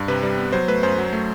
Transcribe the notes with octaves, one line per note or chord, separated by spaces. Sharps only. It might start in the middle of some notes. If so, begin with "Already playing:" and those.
Already playing: G2
C3 B4
G3
B3
F#3 C5
A3 B4
F#2 C5
F#3
A3